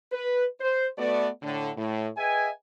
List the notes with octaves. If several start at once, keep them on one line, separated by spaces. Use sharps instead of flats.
B4
C5
A3 B3 F#4 D5
A2 D3
A2
G#4 B4 D#5 E5 G5 G#5